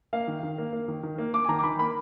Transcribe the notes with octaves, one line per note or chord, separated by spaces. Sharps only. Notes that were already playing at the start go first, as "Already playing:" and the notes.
A#3 F5
D#3
D#3
A#3
A#3
D#3
D#3
A#3
A#3 D6
G#5
D#3 A#5
D6
D#3 B5
A#3 B5